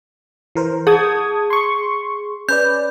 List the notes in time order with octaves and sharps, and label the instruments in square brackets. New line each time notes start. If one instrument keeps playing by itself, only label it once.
[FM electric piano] E3 A#4 C5
[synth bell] G#4 [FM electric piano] A5 D#6 G#6
[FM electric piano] C6 C#6
[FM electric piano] C#4 B4 D5 [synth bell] G6